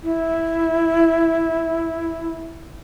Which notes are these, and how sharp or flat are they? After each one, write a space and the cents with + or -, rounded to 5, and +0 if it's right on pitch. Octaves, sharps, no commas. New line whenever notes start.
E4 -5